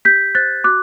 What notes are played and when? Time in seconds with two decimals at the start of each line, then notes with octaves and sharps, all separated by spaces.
0.05 G4 G6 B6
0.35 C5 F#6 A6
0.64 F#4 D6 F#6